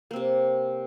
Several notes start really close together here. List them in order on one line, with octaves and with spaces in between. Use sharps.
A#3 C4 C3